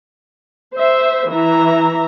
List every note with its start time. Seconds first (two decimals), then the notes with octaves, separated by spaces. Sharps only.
0.75 C5 E5
1.29 E3 E5 A#5